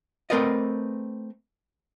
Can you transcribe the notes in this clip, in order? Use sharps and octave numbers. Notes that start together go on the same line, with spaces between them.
A3 C4 A#4 B4 D5 D#5